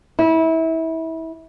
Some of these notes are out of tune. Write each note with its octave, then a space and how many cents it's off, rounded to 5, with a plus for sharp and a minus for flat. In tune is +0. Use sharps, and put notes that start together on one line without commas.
E4 -25